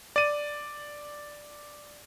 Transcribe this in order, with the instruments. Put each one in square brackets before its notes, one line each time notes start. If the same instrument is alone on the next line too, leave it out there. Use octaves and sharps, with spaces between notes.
[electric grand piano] D5 D#7